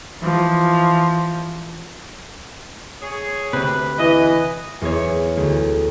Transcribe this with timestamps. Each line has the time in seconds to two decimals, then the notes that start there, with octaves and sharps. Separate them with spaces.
0.19 E3 F3
3.01 G#4 C#5
3.53 D2 C3 B4
3.99 E3 D#5
4.81 E2 G#4 C#5
5.37 D2